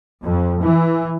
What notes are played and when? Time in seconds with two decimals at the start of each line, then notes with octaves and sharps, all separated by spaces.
0.23 F2
0.60 E3